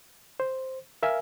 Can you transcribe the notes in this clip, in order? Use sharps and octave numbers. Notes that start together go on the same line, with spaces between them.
C5
A#4 E5 F5 G#5